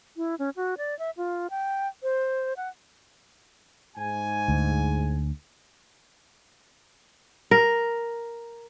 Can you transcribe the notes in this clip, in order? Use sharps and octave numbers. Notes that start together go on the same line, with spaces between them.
E4
C#4
F#4
D5
E5
F4
G5
C5
F#5
G#2 G#5
D2
A#4